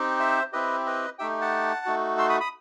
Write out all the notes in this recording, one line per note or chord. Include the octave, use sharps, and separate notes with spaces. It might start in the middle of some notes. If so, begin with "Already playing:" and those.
Already playing: C4 D#4 G4
C5 E5
C4 E4 G4 B4 D#5
B4 D#5
A3 D#4 G4 E5 G5
F#5 A5
A3 D#4 F#4
C6 E6
B5 D#6
B5 D#6